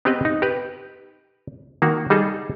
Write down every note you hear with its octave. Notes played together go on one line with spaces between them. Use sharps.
B3 C4 G4 B4 D#5
D#4
G4 B4
D#3 A#3 F#4
G3 D#4 G#4 A4